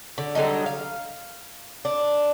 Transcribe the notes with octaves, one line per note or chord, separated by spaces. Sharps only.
D3
D3 F#3 G3 D#4
F5
D4